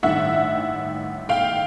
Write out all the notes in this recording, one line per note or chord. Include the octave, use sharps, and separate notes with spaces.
A1 G2 D#3 E5 F#5
F5 G5